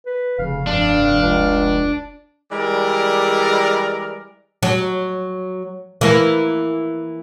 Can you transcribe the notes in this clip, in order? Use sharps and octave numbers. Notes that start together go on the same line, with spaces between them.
B4
F1 C#3 F5
F1 G2 D4
C#2
E3 G3 G#3 A#4 D5
F#3
E3 A#3